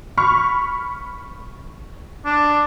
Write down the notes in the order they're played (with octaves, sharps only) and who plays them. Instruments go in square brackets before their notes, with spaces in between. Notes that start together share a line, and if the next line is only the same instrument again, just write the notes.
[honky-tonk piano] B5 C#6 F6
[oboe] D4